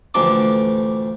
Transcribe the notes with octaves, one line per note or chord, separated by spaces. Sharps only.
A1 D2 F3 D4 D5 D6